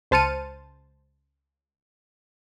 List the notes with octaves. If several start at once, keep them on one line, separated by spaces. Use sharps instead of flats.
C#2 C5 A5 F6 C#7 D#7